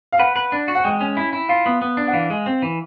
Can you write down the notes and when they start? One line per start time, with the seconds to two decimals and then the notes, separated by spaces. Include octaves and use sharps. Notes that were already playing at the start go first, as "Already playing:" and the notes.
0.12 F5
0.19 B4 F#5
0.36 B4
0.52 D4
0.68 F#4
0.75 F#5
0.84 G#3 G5
1.01 C#4
1.17 E4
1.33 E4
1.49 F4 F5
1.66 B3
1.82 B3
1.97 D4
2.07 F#5
2.13 E3 F5
2.30 G#3
2.46 C4
2.62 E3